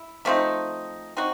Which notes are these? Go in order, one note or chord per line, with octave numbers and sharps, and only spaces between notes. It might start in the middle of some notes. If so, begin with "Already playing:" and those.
Already playing: E4
F3 A3 C4 D#4
C4 D#4 F#4